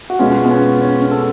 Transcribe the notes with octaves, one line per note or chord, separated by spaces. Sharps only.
F#4
B2 G#3 B3 C#4 F4
B3
C#4
C#4
C#4
A4